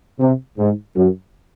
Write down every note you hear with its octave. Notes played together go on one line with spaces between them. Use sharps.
C3
G#2
F#2